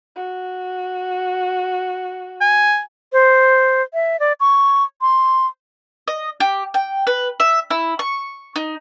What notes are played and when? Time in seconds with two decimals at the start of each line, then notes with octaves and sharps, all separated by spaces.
0.16 F#4
2.41 G#5
3.13 C5
3.94 E5
4.20 D5
4.40 C#6
5.01 C6
6.08 D#5
6.40 G4
6.74 G5
7.07 B4
7.40 E5
7.70 E4
7.99 C#6
8.56 D#4